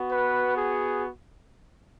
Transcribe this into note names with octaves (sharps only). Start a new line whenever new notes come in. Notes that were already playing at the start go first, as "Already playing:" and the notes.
Already playing: B3 F#4
B4
G#4